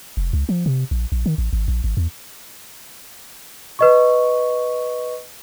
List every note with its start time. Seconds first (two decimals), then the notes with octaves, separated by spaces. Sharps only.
0.17 F1
0.33 C#2
0.49 F3
0.66 C3
0.91 A#1
1.12 A#1
1.26 D#3
1.38 A1
1.53 G#1
1.68 A#1
1.84 G#1
1.97 E2
3.79 B4 D#5 C#6